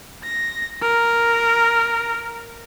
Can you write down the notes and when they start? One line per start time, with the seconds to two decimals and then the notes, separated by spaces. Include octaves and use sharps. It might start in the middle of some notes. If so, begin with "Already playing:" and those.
0.24 A#6
0.82 A#4